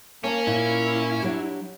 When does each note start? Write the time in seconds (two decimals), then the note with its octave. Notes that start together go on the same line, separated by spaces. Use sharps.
0.24 A#3 C#4 C#5 A5
0.47 A#2 E4 G#5
1.22 F#3 D4 G4